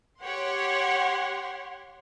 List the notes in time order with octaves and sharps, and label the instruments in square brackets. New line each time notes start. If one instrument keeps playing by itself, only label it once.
[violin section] G4 C#5 F#5 C6